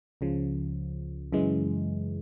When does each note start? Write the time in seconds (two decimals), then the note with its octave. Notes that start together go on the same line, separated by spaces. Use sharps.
0.21 C#2 C#3 F3
1.33 F#2 C#3 E3 G#3